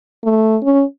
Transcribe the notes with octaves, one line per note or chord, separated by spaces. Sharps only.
A3
C#4